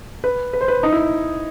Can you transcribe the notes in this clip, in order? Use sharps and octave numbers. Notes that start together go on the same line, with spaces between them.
B4
B4
C5
B4
D#4
E4